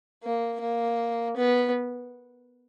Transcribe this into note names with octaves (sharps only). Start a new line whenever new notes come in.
A#3
A#3
B3